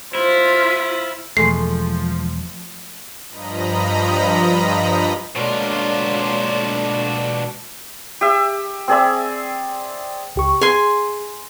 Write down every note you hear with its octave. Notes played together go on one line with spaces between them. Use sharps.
E4 F4 C5 B5
E1 F3 G#3 A3 C7
G2 F3 D#5 A#5 B5
D2 B2 F#3 G#3 A#3 D4 F4
G4 E5
C4 G#4 D5 E5
C#2 G4 C#6
G#4 G#5 C6